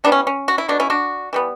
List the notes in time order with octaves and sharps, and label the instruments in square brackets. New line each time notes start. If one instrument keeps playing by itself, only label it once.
[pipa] E3 G3 B3 D4
C#4
C#4
F#4
E4
B2 A3 D4
C#4 E4
D4 F#4
E3 G3 B3